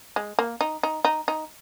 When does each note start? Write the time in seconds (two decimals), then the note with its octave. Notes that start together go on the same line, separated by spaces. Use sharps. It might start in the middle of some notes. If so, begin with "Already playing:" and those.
0.16 G#3
0.39 A#3
0.61 D#4
0.83 D#4
1.05 D#4
1.28 D#4